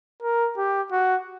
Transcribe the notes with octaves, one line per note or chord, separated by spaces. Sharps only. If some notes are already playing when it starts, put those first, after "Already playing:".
A#4
G4
F#4